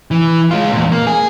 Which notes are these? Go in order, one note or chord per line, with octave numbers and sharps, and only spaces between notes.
E3
G#3 F4
E2 A#2
A#3
G#4